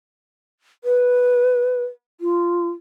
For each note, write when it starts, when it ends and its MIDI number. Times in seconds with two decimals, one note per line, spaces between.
0.84 1.84 71
2.21 2.69 65